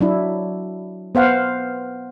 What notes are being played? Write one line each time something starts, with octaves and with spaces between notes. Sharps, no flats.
F#3 D4 E4
B3 C5 F5 F#5